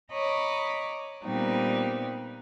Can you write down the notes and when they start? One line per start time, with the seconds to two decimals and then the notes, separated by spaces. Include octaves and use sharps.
0.12 C#5 D#5 A#5 B5 D6
1.24 A#2 G3 B3 C4 D#4